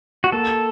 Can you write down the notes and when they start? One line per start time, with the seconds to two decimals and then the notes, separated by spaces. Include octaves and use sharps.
0.24 F#4
0.32 A#3 A4